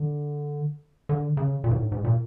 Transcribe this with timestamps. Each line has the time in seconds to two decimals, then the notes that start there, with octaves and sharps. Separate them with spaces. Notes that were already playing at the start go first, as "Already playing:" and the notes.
Already playing: D3
1.09 D3
1.37 C#3
1.64 A#2
1.71 G#2
1.77 A2
1.92 G#2
2.04 A#2